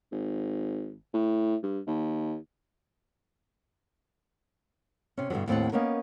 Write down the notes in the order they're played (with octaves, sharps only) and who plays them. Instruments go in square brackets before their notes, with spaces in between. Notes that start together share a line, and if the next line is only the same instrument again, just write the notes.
[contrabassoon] G#1
A2
G2
D#2
[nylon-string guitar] C3 C#4
G2 B2 D3 F3 F#3
D#2 A2 C4 A4 F#5
A#3 B3 C#4 D#4 A#4